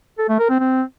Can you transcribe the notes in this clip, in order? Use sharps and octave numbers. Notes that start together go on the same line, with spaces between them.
A4
A3
A#4
C4
C4